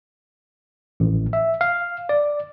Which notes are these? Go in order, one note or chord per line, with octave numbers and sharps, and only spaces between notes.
A1
E5
F5
D5